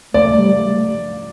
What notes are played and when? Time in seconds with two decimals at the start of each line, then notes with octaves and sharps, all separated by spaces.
0.14 A3 D5
0.35 G3
0.56 A3